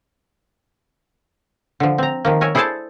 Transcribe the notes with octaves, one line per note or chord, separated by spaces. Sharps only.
D3 F3
C4 A#5
D#3 F3 A#3
A#4 C#5 E5 G#5
E4 G#4 A4 C5 D5 A5